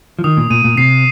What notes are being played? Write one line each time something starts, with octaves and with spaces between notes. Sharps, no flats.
F3
D#3 D#6
A#2
A#2 D#7
A#2
C3 C7